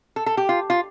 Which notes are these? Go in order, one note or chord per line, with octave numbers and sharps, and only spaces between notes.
A4
A4
G4
F4
F4